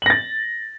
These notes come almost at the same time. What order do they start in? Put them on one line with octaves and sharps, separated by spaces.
F#7 A#6 A6